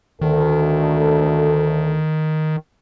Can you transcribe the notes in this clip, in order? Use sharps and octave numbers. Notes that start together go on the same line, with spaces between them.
D2 D#3 A4